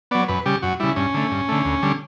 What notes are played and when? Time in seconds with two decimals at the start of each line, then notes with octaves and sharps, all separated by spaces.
0.11 F#3 B3 D5
0.28 F#2 B4
0.46 C#3 G3 G4
0.62 F#2 F#4
0.80 C#3 G3 E4
0.96 G2 C#4
1.14 D3 A3
1.31 G2
1.48 D3 A3
1.65 D2
1.82 D3 G3